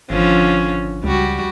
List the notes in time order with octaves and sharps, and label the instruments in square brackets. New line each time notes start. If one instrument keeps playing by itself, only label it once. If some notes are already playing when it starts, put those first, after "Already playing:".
[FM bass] G#1 [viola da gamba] D3 F3 C#4
[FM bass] C#2 [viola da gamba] G3 F#4